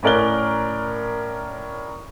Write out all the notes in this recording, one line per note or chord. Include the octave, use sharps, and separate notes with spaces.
A2 C#4 A#4 D5 F#6 G7